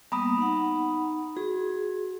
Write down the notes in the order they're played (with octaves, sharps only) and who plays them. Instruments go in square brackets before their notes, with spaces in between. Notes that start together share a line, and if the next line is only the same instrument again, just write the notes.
[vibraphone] G3 A#3 B3 [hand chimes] A#5 B5 D#6
[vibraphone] D#4 F#5
[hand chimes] F#4 [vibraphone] G#4